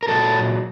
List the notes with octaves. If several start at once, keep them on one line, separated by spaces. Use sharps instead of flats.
A#4
A#2 F#3 A4